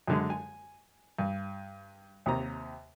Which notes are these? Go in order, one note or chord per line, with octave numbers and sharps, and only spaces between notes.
F#2 D3 G#3
G#5
G2
D#2 C3 A#5